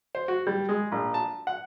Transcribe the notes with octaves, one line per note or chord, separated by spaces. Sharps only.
C5
F#4
G3
G#3
A#1
A5
F#5